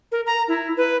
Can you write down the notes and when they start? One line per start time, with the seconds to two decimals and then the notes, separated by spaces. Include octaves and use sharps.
0.12 A#4
0.26 A#5
0.48 E4
0.77 B4